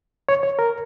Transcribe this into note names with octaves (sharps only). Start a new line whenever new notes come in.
C#5
C#5
A#4